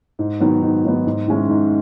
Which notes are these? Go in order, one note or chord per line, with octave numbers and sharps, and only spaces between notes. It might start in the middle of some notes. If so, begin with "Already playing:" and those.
G#2
D#3 F#3 B3
G#2
D#3 F#3 B3
G#2
D#3 G#3 C#4 E4
G#2